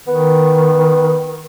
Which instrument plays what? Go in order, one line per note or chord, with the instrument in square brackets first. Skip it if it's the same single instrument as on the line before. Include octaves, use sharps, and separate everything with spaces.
[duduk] D#3 [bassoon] B3